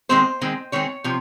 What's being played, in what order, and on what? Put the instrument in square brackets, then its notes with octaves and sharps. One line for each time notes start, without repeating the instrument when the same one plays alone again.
[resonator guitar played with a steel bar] D#3 G#3 C4 C5
D#3 G#3 C4
D#3 G#3 C4 C#5
C3 F3